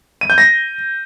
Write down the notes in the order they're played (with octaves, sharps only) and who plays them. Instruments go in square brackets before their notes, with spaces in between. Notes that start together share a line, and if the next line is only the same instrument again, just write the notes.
[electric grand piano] D#7
G6
A#6